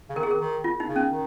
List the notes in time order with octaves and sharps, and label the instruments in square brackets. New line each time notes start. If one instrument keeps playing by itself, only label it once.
[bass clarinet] C#3
[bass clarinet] D#3 [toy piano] A#4
[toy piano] G#4
A#4
[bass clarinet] D#3
[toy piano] F4
D#4
[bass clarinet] C#3
[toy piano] C#4
[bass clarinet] D#3